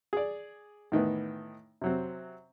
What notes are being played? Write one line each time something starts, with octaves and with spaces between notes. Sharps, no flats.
G#4 D5
A2 D#3 E3 B3
C3 F#3 C4